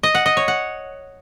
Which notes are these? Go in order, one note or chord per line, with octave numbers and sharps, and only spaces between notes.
D#5
F#5
D#5
C#5
F#5